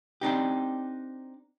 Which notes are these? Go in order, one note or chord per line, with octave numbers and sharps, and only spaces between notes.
C4 D4 D#4 G4